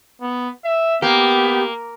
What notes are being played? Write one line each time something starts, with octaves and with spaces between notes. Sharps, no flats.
B3
E5
A#3 B3 G4